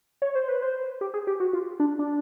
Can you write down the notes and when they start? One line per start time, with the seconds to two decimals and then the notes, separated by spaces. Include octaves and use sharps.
0.22 C#5
0.35 C5
0.48 B4
0.62 C5
1.01 G4
1.14 G#4
1.27 G4
1.40 F#4
1.53 F4
1.80 D4
1.99 D4